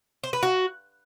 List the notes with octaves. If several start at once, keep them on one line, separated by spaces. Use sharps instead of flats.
C5
B4
F#4